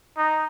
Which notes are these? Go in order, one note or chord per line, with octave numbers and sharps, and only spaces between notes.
D#4